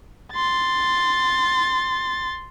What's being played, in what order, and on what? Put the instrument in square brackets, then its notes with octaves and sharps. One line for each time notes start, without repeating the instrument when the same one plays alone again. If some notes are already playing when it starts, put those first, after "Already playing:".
[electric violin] C6 A6